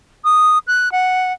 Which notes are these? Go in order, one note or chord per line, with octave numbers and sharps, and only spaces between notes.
D#6
F#6
F#5